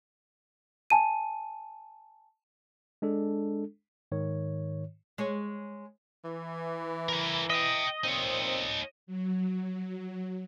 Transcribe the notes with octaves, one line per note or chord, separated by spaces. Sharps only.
G#5 A5 D#7
G#3 D4 A4
G#2 D#3 C#5
G#3 C#5
E3
E4 A#4
D#5 E5 G5
A#2 C4 D#4 C#5
F#3